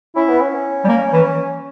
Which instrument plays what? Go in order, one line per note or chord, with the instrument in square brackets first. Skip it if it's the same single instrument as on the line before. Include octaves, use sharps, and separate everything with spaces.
[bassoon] C#4 [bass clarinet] E4
[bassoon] B3
C#4
[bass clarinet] G3
A#3
E3